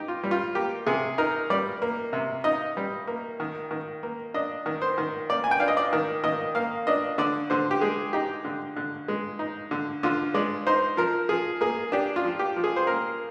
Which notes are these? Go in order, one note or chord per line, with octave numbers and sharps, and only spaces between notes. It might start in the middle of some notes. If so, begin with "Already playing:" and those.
Already playing: D#4 G4
F4
G3
F4
A#3 G4
C3 G#4
D#4 A#4
G3 D5
A#3
C3
D#4 D#5
G3
A#3
D#3
D#3
A#3
D4 D#5
D#3
C5
D#3
A#3 D5
G#5
G5
D4 F5
D#5
D5
D#3
D#3 D#5
A#3 F5
D4 D#5
D3 D5
D3 C5
G4
G#3 G#4
D#4 G4
D3
D3
G#3
D#4
D3
D3 F4
G#3 D5
D#4 C5
F3 A#4
F3 G#4
A#3 G#4
D4 G4
F4
F3
G4
F3
G#4
C5
A#3 A#4